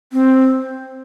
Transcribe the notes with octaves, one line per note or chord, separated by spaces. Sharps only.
C4